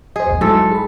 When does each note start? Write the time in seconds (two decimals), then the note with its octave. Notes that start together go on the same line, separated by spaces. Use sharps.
0.16 G#4 C5 D#5
0.27 A#1 E2
0.41 G#2 F#3 G#3 E4 A4
0.72 G#4 B5